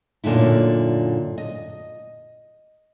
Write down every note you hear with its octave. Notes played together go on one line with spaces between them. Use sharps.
F#2 A#2 D3 D#4 E4
D#5